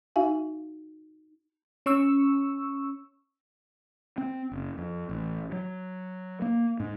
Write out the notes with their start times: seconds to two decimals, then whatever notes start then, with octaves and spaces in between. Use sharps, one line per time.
0.16 D#4 F#4 E5 F5 G#5
1.86 C#4 C#6 E6
4.18 C4
4.51 F#1
4.78 F2
5.09 A1
5.52 F#3
6.42 A#3
6.80 G#2